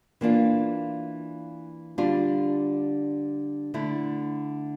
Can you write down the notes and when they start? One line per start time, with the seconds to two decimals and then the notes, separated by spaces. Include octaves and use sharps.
0.21 E3 A#3 D4 F4
1.98 D3 G3 D4 F4
3.74 D3 A3 E4